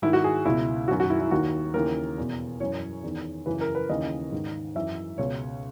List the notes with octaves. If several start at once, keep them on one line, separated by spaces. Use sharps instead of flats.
G#2 D#3 E4
F#4
G#4
C#2 B2 E4
F#2 D#3 F#4
F#4
E4
E4
D#2 D#3 F#4
D#2 C#3 E3 A#4
E2 B2
F#2 E3 C#5
E2 D#3
F#2 C#3 E3 B4
A#4
B4
D#2 C#3 E3 D#5
G#2 D#3
F#2 E3 E5
C#2 B2 C#5